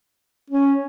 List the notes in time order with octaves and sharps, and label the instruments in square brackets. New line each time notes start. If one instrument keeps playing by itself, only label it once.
[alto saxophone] C#4